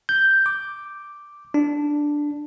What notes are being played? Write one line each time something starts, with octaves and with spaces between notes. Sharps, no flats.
G6
D6
D4